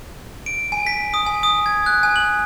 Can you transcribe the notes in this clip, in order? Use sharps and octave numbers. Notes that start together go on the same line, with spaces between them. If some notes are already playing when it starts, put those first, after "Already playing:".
D7
G#5
B6
D#6
G#5
D#6
G#6
F#6
G#5
F#7